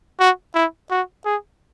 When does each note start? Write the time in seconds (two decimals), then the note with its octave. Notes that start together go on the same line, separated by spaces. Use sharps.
0.20 F#4
0.55 E4
0.90 F#4
1.25 G#4